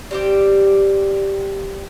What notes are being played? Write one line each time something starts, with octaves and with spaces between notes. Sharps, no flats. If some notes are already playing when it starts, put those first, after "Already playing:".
G3 C4 G4